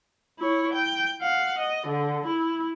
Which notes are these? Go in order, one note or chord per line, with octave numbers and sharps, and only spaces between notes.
E4 C#5
G5
F5 F#5
D#5
D3
E4